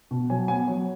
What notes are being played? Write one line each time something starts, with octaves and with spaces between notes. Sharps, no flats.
B2
F#3 G#5
B3 G#5
F#3